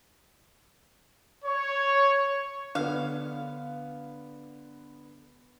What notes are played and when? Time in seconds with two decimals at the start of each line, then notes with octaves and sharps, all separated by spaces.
1.45 C#5
2.75 D3 B3 F5